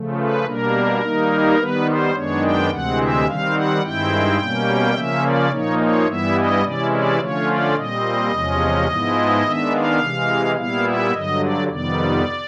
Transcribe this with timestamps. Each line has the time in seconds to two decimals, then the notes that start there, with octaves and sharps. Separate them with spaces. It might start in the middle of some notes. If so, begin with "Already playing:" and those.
Already playing: C#3 F3 A3
0.17 B4
0.45 B2 G3 A#3 D4 A#4
1.02 D#3 G3 A#3 D#4
1.57 D#3 G3 B3 B4
1.86 C5
2.14 F#2 D#3 G#3 B3 D4 C#5
2.42 G5
2.70 D2 C3 E3 G#3 C4 F#5
2.98 E5
3.26 D#3 G3 C4 F5
3.54 F#5
3.82 G2 D#3 G#3 C4 E4 G5
4.38 B2 G3 A#3 C#4
4.94 C#3 F3 A#3 C#4 E5
5.22 D5
5.51 A#2 F3 A#3 D#4 C#5
5.79 C#5
6.07 G2 E3 G3 B3 E4 E5
6.35 D#5
6.63 C3 E3 G#3 C#4 E4 D5
6.91 D5
7.19 D3 F3 A3 C#4 F4 C#5
7.47 D5
7.75 A#2 G3 C4 D#5
8.31 E2 C3 F3 G#3 C#4
8.87 G#2 F3 G#3 B3 E4
9.43 D#3 G#3 B3 D4 E5
9.72 F5
10.00 C3 E3 G#3
10.56 A#2 G3 B3 E4 F5
10.84 E5
11.12 G2 D3 F#3 D#5
11.40 D5
11.68 F2 C3 D#3 G3 B3 D5